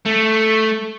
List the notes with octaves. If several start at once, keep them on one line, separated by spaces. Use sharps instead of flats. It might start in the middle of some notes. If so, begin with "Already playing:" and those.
A3